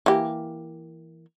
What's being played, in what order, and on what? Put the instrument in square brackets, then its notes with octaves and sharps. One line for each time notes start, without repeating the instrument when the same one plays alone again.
[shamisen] E3 A#3 G4